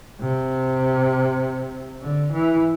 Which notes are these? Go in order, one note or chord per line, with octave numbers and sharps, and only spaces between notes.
C3
D3
E3